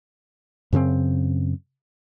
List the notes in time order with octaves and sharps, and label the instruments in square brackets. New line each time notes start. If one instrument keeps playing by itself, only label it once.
[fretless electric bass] F#2 C#3 B3 C4